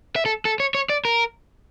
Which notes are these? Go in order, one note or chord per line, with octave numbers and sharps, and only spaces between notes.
E5
A4
A4
C#5
C#5
D5
A#4